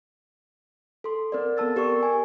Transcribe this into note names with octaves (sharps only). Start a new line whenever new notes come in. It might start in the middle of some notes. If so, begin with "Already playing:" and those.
A4 C6
C4 A#4 D5
B3 A4 A5 E6 A6
G4 A#4 D5 C#6
G#5